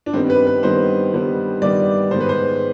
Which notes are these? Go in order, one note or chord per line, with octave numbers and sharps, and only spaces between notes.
D4
G2 D#3 G3 B3 C4
B4
B4
G2 D#3 G3 B3 C5
G2 D#3 G3 B3
G2 D#3 G3 B3 D5
G#2 D#3 G#3 B3 C5
B4
C5